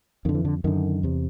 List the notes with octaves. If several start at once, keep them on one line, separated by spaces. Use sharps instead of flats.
F2 D3 D#3
E3
D3
F#2 D3 D#3
E2 C3